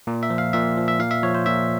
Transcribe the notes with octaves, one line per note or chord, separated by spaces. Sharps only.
A#2
E5
F3
F5
A#2 E5
F3
E5
A#2 F5
E5
F3 C#5
C5
A#2 E5